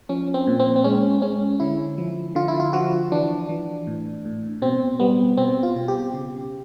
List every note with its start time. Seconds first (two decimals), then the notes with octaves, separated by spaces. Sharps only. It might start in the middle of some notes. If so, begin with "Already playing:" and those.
0.09 F3 C#4
0.34 C4
0.47 A#2
0.59 C4
0.76 C4
0.84 G#3 C#4
1.22 G#3 C#4
1.60 D3 E4
1.98 F3
2.35 D3 F4
2.48 E4
2.60 F4
2.73 F3 F#4
3.12 E3 D4
3.49 E3
3.87 A2
4.25 A2
4.62 B2 C4
5.00 G3 B3
5.37 B2 C4
5.63 F4
5.76 B2
5.88 G4
6.14 C#3